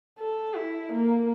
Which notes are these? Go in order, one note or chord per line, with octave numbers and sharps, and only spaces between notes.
A4
E4
A#3